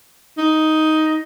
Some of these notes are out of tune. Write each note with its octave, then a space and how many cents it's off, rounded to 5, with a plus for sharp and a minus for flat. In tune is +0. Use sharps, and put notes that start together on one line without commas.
D#4 +10